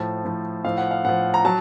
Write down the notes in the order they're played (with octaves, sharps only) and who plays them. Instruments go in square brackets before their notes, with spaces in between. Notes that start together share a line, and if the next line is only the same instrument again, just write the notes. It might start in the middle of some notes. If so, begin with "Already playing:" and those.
Already playing: [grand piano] A2 F3 A5
A2 F3
A2 F3 F5
F#5
F5
A2 F3 F#5
A#5
F#3 A5